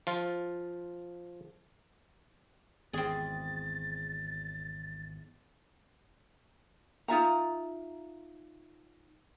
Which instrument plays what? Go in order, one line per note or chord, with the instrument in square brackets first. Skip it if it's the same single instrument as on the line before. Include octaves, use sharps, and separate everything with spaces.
[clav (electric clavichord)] F3 F4
[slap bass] G#1 [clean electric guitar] E2 [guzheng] C4 G#4 [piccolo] A6
[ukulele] D#4 F4 E5 A#5